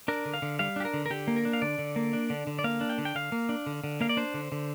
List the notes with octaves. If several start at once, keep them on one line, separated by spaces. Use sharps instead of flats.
D4 A#4
D3
F5
D3
G3 F5
D4 G4
A#4
D3
A#4
D3 G4
A#3
A#4
D4
F5
D3 D5
D3
A#3
D4
D3
D3
D5
A#3 F5
D4
G5
D3
G5
D3 F5
A#3
D4
D3
D3
A#3 F5
D5
D4 C5
D3
D3